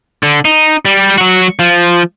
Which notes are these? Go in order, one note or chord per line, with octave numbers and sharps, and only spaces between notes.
D3
D#4
G3
F#3 F#4
F3